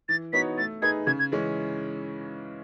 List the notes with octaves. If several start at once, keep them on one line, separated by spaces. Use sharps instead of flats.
E3 A6
B3 D#4 F#4 C#5 B6
A3 A6
D#4 G#4 B4 G#6
C#3 G#6
G#6
E3 G#3 C#4